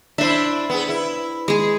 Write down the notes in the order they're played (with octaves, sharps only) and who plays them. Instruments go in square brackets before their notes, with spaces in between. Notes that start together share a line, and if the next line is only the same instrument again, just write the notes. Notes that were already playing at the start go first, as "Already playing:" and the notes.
[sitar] D4 E4 [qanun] C5 E5
[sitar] B3 G#4
E4
[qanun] G#3 G#4